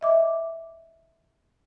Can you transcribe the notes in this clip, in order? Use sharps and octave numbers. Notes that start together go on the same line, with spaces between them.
D#5 E5 D6